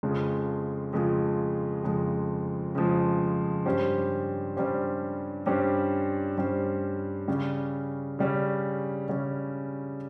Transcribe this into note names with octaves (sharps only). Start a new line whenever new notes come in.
F2 C#3 F3 G#3
F2 C#3 F3 G#3
F2 C#3 F3 G#3
F2 C#3 F3 G#3
G2 G3 C#4 G4 C5
G2 G3 C#4 G4 C5
G2 G3 C#4 G4 C5
G2 G3 C#4 G4 C5
C#3 G3 C#4
C#3 G3 C#4
C#3 G3 C#4